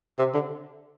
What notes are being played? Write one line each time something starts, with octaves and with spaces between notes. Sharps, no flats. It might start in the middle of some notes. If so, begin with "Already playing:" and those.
C3
D3